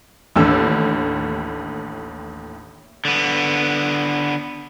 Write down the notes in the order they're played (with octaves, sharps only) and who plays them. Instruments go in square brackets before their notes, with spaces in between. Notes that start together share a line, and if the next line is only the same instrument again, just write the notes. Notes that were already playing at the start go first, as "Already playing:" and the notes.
[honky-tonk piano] A1 D#2 A2 D4 E6
[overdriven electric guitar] D3 B3